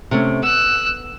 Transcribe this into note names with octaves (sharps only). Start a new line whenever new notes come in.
C3 A3 C#4
B3 E6 F#6